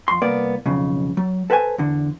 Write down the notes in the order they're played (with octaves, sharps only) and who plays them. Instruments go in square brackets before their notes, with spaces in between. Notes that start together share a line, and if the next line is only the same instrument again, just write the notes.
[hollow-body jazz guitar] F2 C6
C2 A#3 B3 D5
B1 F2 C#3
F#3
A4 B4 C5 G5 G#5
E2 D3